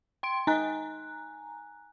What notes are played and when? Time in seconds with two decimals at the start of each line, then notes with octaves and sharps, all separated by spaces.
0.23 G5 C6 D7
0.47 D#4 G#5 A#5 F#6